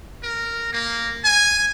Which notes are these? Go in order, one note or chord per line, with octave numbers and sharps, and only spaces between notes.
A#4
A#3
G#5